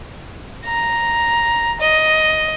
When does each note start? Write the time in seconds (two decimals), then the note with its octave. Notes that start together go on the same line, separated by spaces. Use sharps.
0.65 A#5
1.81 D#5